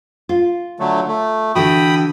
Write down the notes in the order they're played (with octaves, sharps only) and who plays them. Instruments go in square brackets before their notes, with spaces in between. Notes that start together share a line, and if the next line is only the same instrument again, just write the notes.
[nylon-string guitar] F4
[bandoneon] D3 F#3 A3
A3
[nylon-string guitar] D3 E3 F#4 [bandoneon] G5 B5 D#6